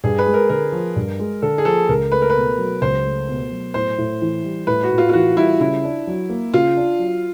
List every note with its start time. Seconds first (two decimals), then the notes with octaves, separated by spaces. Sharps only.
0.04 G2 G#4
0.18 B4
0.27 G#3
0.34 A#4
0.49 D3 A#4
0.72 F3
0.96 G2
1.20 G#3
1.42 D3 A4
1.58 G#4
1.65 F3 A4
1.89 C#2 A#4
2.12 A3 B4
2.22 A#4
2.30 B4
2.36 B2
2.58 F#3
2.81 C#2 C5
3.05 A3
3.29 B2
3.51 F#3
3.74 A2 C5
3.98 A2
4.22 E3
4.44 G3
4.67 A2 B4
4.83 F#4
4.91 A2
4.98 F4
5.09 F4
5.13 E3 F#4
5.37 G3 E4
5.60 C#3 E4
5.84 D4
6.07 F#3
6.29 A#3
6.53 C#3 F4
6.76 D4
6.99 F#3